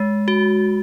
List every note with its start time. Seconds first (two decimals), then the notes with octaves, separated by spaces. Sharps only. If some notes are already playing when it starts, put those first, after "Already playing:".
Already playing: G#3
0.28 F#4